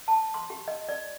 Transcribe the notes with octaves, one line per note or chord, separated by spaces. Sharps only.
A5
C6
G4
D#5
D5